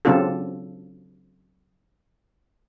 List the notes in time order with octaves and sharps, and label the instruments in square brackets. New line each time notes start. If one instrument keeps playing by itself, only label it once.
[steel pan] C#3 F#3 C4 D4 F4 A4